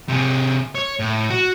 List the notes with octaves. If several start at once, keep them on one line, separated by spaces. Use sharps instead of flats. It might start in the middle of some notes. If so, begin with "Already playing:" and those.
C3 G#4
C#5
A2
F#4